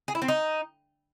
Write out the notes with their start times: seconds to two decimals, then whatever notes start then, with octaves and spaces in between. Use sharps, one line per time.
0.08 G#4
0.15 E4
0.22 C4
0.28 D#4